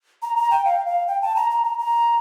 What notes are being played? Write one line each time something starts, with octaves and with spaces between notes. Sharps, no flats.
A#5
A#5
G5
F5
F5
G5
A5
A#5
A#5
A#5
A#5